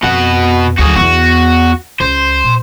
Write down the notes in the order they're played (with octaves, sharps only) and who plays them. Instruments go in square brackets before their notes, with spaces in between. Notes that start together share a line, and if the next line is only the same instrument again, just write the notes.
[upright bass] F2 [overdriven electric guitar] B2 F#5
[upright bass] D2 F#3 [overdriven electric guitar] F#4 G#4
[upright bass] E2 B3 [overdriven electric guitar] F#4
[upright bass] C#2 [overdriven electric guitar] C5
[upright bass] A#2